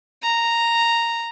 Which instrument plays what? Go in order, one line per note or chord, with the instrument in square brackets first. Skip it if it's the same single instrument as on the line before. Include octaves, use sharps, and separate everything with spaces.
[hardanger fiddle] A#5